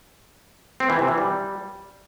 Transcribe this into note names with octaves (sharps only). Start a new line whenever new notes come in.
C4
E3
C3
E3
G3